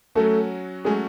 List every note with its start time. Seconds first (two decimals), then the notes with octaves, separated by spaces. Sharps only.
0.15 F#3 A3 C#4 F#4 A4
0.85 F#3 G#3 A3 C#4 F#4 G#4